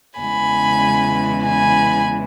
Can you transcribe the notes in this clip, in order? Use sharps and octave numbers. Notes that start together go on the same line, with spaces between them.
E2 C#3 E3 G#3 G#5 B5
G#5 B5